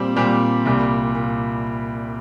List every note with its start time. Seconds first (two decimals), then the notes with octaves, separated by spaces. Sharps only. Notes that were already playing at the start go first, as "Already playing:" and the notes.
Already playing: A#2 G3 C4
0.16 A#2 G3 C4
0.65 C2 A#2 G3
1.14 A#2